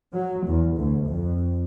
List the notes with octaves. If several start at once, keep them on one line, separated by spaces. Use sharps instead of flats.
F#3
E2
D2
F2